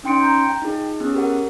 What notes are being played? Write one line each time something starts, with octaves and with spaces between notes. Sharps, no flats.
C#4 D#4 G5 C6 C#7 D7
A#5 G6
G5
D#4 F4 G#4
B3 C#4 G#4
G4 A#4 F#5